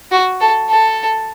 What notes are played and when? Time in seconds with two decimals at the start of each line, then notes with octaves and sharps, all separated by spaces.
0.12 F#4
0.41 A4
0.70 A4